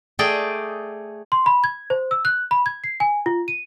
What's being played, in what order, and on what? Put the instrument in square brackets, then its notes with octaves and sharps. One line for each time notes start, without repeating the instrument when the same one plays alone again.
[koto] A3 G#4 D5 D#5 G5
[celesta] C6
B5
G#6
C5
E6
F#6
B5
G#6
C7
G#5
F4
D#7